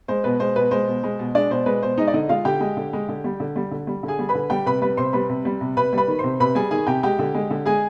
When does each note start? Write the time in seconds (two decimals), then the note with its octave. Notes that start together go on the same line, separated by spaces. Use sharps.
0.08 G#3 C5
0.24 B2 B4
0.40 G#3 C5
0.56 B2 B4
0.71 G#3 C5
0.87 B2
1.04 G#3
1.19 B2
1.35 G#3 D4 D5
1.50 B2 C5
1.66 G#3 B4
1.82 B2 C5
1.98 G#3 D#4 D#5
2.07 D5
2.14 D3 D#4 D#5
2.29 G#3 F4 F5
2.45 D3 G4 G5
2.61 G#3
2.77 D3
2.93 G#3
3.08 D3
3.24 G3
3.40 D3
3.56 G3
3.71 D3
3.87 G3
4.03 D3
4.08 G#4 G#5
4.19 G3
4.29 B4 B5
4.35 D3
4.50 G3 G4 G5
4.66 C3 B4 B5
4.82 G3 B4 B5
4.97 C3 C5 C6
5.13 G3 B4 B5
5.29 C3
5.45 G3
5.61 C3
5.77 C3 B4 B5
5.93 G3 B4 B5
6.08 D#3
6.19 C3 C5 C6
6.40 C3 B4 B5
6.55 G3 G#4 G#5
6.71 D#3 G#4 G#5
6.87 C3 G4 G5
7.03 G#3 G4 G5
7.19 D3
7.34 G#3
7.50 D3
7.66 G#3 G#4 G#5